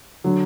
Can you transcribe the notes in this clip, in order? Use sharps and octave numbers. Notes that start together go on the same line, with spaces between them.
D3 F#3